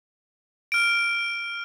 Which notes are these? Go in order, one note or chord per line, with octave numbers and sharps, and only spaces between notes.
F6 D7